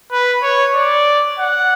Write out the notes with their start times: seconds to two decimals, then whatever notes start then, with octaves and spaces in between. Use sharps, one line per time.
0.12 B4
0.43 C#5
0.75 D5
1.39 F#5